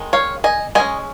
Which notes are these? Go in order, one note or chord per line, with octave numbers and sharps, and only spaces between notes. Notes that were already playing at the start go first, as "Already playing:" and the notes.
Already playing: D#3 G#3
C#5 F5
D#5 G#5
G#3 C#4 D#5 G#5